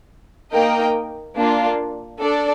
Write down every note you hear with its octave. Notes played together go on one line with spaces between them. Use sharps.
A#3 D#4 A#4 D#5 G5
A#3 D4 F4
D4 A4 D5